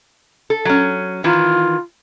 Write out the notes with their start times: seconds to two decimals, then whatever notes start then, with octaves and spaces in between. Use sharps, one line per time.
0.50 A4
0.65 F#3 C#4
1.24 D#3 E3 F4